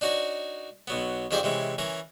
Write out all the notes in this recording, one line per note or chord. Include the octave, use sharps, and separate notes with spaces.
D4 D#4 F#4 C#5
B1 F#3 B3
F2 D#3 C4 G4 G#4 D5
C3 E3 G#3 C#4
E3 C#4 A#4